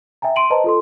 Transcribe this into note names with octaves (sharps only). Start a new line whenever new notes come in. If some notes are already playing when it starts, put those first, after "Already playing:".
E5 G5 G#5 A#5
C6 D7 D#7 F#7
B4 C5 D#5 A5 A#5
F4 A4 C6